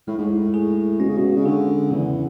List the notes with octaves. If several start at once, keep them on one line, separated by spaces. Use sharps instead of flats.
A2 G#3
G#2
A2
G#4
B2 C#4
C#3
B2
C#3
D3 G#4
E2 C#3